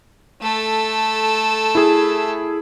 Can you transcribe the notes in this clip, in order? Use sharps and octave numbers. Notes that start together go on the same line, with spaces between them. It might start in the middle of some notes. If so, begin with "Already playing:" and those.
A3 A4
E4 G#4